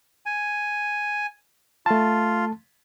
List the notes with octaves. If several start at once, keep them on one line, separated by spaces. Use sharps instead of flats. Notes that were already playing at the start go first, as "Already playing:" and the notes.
G#5
A3 F4 A5